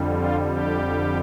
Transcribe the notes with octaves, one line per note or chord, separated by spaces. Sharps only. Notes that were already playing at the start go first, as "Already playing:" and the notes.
Already playing: F2 D3 G3
F4
G4